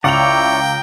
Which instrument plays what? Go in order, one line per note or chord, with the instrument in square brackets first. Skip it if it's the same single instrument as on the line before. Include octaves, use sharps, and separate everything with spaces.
[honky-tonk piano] C#2 D6 F7 [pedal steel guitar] E4 C#5 D5 [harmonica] G5 A#5